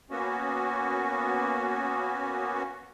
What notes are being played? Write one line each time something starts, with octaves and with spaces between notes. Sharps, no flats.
A#3 B3 C#4 F#4